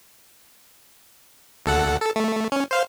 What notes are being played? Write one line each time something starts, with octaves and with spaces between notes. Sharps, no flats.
D2 A4 F#5
A4
A3
C#4
C5 F5